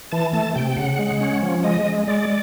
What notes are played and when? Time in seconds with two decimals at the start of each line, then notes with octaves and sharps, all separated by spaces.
0.12 E3 A5
0.33 A3 A5
0.55 C3 G5
0.72 G5
0.77 C#3 F#5
0.99 G#3
1.21 C#4
1.42 F3
1.64 G#3 D#5
1.86 G#3
2.08 G#3 D5